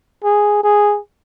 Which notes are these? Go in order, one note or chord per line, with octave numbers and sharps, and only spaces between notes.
G#4
G#4